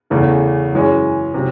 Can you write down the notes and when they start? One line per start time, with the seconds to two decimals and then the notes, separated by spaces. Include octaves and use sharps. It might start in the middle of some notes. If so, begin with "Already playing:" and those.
0.10 E2 C#3 E3 A3
0.73 F#2 E3 G#3 C#4
1.34 C3 F#3